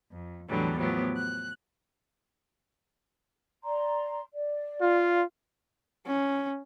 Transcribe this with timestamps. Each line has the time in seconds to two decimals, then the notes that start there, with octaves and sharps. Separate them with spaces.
0.11 F2
0.49 E2 A2 D3 E3 F#3 G3
0.79 A2 F3 F#3 B3 G4
1.15 F#6
3.64 D5 A#5 C6
4.33 D5
4.81 F4
6.07 C#4